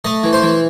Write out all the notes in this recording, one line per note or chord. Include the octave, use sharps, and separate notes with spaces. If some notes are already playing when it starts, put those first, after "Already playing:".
A3 D#5
E3
C5
E3